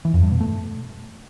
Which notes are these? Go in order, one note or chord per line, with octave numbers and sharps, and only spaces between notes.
E3
F2
G2
B2
A3